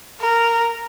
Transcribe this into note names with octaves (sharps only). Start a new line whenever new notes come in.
A#4